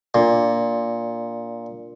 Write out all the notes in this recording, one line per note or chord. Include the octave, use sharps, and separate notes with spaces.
A#2 D4 F4 A#4 D5